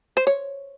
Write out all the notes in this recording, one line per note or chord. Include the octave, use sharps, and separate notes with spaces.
C5
C#5